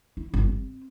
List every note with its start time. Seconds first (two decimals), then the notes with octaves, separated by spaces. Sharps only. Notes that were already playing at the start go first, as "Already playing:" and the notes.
0.17 E4
0.34 G1
0.48 C4